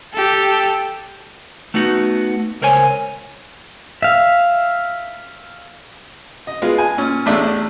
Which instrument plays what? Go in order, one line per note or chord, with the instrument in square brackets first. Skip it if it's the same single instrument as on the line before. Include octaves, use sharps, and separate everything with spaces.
[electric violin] G4 A4
[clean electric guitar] A3 B3 D#4 F#4
C#2 A#4 C5 C#5 G#5
[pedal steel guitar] E5 F5
[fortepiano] D#5
G#3 B3 F4
G#5
A#2 C#4
A1 E2 A2 A3 D4 E5